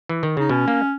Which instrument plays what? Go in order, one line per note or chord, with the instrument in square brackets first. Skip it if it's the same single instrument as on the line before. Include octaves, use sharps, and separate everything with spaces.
[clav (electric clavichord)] E3
D#3
[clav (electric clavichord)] C#3 [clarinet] D#4
[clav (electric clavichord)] B2 [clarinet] C#4
[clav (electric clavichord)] A#3